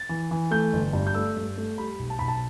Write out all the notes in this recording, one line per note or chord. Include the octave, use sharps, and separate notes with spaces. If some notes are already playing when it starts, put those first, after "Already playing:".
Already playing: A6
E3
E3
A3 G6
G1
G2
G6
A3 E6
G2
A3
G3 B5
B1
A5
B1 B5
A5